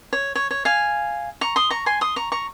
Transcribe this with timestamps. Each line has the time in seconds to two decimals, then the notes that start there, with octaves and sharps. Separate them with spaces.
0.13 C#5
0.35 C#5
0.51 C#5
0.65 F5 G#5
1.41 A#5 C#6
1.56 C6 D#6
1.70 A#5 C#6
1.86 G#5 C6
2.01 C6 D#6
2.16 A#5 C#6
2.32 A#5 C#6